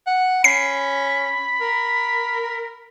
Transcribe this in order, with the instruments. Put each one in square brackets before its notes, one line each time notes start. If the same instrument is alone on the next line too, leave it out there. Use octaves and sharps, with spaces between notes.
[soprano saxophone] F#5
[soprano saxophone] C#4 [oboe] B5 [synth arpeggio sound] C7
[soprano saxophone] A#4